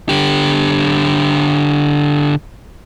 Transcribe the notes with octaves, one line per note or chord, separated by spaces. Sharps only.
D3 G4